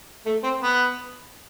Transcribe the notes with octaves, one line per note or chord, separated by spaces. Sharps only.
A3
C4
B3